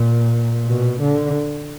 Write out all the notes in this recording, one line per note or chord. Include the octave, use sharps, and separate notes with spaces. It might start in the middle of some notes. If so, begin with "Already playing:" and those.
Already playing: A#2
B2
D3